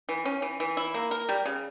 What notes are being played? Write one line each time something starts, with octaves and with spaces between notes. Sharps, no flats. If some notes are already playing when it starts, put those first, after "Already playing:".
E3
C#4
E3
E3
E4
A#3
A#4
G3
C#3